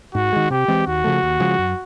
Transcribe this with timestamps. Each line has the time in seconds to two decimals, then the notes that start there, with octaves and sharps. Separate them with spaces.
0.15 G#2 F#4
0.32 D#3 G#3
0.50 C3 G4
0.68 E3 G#3 C4
0.86 D#2 F#4
1.04 C#3 F3 A3
1.23 D#2
1.40 C#3 F3 G#3
1.58 F#2